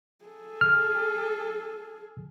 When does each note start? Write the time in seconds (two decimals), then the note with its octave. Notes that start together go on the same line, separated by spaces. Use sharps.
0.25 G#4 A4
0.61 F6